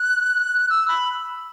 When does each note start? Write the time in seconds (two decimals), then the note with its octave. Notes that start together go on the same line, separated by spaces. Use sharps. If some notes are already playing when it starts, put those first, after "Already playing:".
Already playing: F#6
0.70 E6
0.88 B5